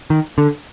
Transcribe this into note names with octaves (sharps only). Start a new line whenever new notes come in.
D#3
D3